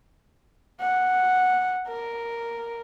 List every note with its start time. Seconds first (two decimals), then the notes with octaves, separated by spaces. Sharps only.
0.80 F#5
1.87 A#4